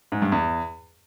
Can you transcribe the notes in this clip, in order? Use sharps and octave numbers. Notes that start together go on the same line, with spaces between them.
G#2
G2
E2